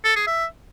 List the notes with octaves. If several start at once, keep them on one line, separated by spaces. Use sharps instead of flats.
A4
G#4
E5